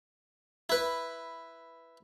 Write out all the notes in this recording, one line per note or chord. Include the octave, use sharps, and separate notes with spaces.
E4 B4